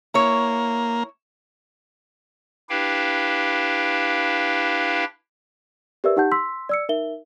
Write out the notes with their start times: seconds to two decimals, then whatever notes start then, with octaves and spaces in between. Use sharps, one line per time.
0.14 A#3 E4 C#5
2.70 D4 E4 G4 B4 F5 G5
6.04 G4 A#4 B4 D5 E5 E6
6.16 D#4 G4 F#5 A5 G6
6.32 C6 E6 B6
6.69 D5 E6 C#7
6.89 D#4 A#4 E5 G7